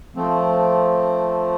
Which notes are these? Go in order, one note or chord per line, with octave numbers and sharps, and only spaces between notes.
F3 A3 C4